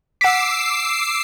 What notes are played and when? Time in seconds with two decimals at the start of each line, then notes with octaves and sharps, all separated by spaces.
0.21 F#5 D6 E6 B6 C7